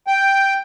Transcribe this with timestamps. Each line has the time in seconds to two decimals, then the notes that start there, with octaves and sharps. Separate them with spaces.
0.07 G5